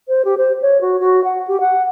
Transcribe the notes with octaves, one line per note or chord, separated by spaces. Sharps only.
C5
G4
C5
C#5
F#4
F#4
F#5
G4
F#5